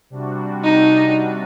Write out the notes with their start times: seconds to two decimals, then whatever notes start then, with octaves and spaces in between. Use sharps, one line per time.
0.10 C3 G3 D4 F#4
0.63 D#4